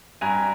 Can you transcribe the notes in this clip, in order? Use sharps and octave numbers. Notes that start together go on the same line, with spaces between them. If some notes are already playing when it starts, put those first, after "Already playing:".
G2 G#5 A#5